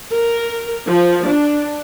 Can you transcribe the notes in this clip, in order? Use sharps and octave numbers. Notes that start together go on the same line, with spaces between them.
A#4
F3
D4